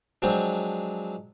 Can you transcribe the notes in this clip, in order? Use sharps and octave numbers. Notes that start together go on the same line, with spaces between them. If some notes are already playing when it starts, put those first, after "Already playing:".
F3 F#3 G#3 C4 D4